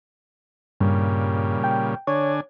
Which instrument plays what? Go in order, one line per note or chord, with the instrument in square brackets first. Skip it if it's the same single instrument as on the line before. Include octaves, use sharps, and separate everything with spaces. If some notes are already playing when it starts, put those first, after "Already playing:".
[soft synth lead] G2 [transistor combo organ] A#2 C#3 G3
[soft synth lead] G5
[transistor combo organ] D3 D4 G#5 [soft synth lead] C#5